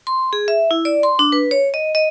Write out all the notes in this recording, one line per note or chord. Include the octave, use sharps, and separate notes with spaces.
C6
G#4
E5
E4
D5
C6
D4
B4
C#5
D#5
D#5